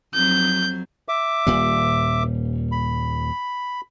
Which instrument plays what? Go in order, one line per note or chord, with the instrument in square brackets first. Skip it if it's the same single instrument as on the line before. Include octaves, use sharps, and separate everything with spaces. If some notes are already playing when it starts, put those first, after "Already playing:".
[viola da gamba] F2 F#3 C4 [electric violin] G6
[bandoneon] E5 D6
[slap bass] D#1 A#2 G3
[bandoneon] B5